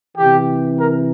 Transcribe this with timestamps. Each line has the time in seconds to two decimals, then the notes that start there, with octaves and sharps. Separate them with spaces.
0.18 C3 E3 G4
0.78 A#4